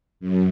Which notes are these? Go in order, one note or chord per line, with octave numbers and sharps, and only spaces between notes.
F#2